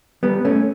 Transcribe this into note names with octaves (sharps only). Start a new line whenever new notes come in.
G3 B3
A3 C#4